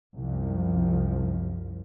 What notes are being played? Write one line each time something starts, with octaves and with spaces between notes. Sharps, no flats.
C2 F#2 F3